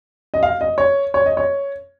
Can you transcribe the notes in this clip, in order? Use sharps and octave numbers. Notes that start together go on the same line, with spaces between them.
D#5
F5
D#5
C#5
C#5
D#5
C#5